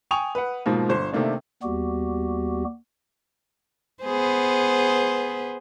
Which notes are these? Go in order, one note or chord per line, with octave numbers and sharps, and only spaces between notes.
G5 G#5 C#6 D#6 F7
B4 F#5
G#2 B2 F3 A#3
G1 C5
C3 D#3 A3 A#3 D4
D#2 G3 B3 F#4 G4
B3 G#4 C5